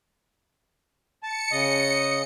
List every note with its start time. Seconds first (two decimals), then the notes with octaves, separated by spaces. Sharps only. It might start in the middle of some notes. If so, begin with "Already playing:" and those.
1.23 A5 C#7
1.52 C#3 D#5 D#6